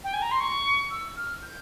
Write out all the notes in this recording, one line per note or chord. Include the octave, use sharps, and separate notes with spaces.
G5
G#5
A#5
C6
C#6
E6
F6
G6